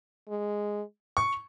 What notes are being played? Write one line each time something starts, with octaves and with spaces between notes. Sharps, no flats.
G#3
C#6